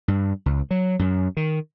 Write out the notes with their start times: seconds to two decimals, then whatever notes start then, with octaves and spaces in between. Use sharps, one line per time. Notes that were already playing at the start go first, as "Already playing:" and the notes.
0.08 G2
0.46 C#2
0.71 F#3
0.99 F#2
1.37 D#3